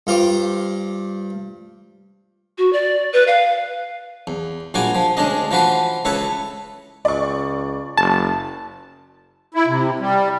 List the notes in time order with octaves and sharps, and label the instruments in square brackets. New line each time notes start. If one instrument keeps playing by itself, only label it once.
[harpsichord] G2 F4 C5 D6
[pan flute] F#4
D5
B4
F5
[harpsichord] E2
A#1 G3 F4 F#4 G#5 D6
F3
D2 G#3 C#4 D4 D#5
E3 F3 F#4 B4 C5
C#2 E4 A4 B4 C#5
[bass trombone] C#2 [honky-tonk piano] D5 C#6
[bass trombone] F#1 [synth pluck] A5
[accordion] E4
C3
G3